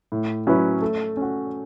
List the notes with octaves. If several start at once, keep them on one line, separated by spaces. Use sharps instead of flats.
A2
F#3 C#4 E4 B4
A3
C#4 F#4